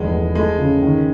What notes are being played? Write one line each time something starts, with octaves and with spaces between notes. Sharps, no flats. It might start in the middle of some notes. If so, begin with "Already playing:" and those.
Already playing: F1 E2 G#3
A3
G#3 A3
C#3
D#3